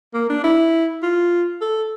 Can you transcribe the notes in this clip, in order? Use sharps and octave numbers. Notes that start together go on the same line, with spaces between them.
A#3
D4
E4
F4
A4